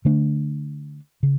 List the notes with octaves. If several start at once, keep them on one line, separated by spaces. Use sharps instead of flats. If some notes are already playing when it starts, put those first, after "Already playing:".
D3 A3 D4
C#3